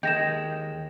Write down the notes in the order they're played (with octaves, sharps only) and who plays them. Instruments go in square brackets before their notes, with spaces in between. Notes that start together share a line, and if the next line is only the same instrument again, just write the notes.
[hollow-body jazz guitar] D#2 [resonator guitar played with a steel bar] G#3 [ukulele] A#4 G5 [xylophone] G6 A#6 E7